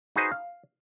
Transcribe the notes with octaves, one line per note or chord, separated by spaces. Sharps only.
D#4 F#4 G#4 B4 C5 D#5
F5